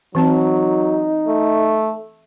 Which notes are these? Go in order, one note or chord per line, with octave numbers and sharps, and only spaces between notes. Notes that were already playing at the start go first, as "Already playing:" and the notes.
E3 F#3 C4 D#4 A5
A3